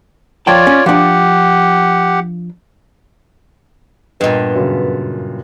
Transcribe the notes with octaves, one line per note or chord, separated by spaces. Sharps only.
F3 F4 C#5 D5 G5 A5
C#4
F3 D4 G4 F#5
G2 A#2 B3 D#5
F#2 C#3